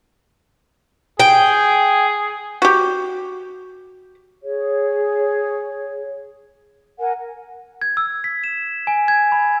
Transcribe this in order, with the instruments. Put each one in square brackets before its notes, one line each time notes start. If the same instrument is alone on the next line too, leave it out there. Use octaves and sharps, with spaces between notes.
[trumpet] G#4 [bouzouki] G5
[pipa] F#4 G4
[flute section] G#4 C#5
A#4 F#5 G#5
[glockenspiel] G#6
E6
B6
E7
G#5
G#6
B5